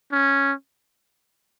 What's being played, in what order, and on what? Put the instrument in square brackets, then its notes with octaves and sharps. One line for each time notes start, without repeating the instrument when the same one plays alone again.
[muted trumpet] C#4